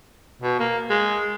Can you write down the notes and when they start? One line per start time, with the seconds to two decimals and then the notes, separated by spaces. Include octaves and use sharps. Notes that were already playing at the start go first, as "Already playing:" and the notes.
0.42 B2
0.59 A#3
0.90 G#3